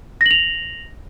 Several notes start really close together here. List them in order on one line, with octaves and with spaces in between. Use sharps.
A#6 F#7 F7